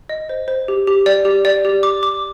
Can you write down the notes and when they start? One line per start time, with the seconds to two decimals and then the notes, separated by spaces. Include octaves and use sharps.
0.09 D#5
0.29 C5
0.48 C5
0.68 G4
0.87 G4
1.06 D5
1.25 G4
1.45 D5
1.65 G4
1.83 D6
2.03 D6